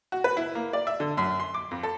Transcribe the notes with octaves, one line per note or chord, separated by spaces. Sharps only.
F#4
B4
E4
A#3
D5
E5
D3
F#2
C6
D6
F2
A4